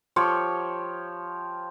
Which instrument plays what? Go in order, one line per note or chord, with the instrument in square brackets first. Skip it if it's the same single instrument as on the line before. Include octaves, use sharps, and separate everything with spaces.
[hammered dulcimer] F3 G4 C#5 C#6